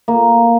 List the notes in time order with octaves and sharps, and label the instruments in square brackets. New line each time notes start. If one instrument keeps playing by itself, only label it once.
[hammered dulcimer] A#3